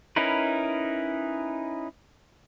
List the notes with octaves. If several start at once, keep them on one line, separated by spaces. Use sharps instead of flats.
C#4 D#4 E4 A#4 B4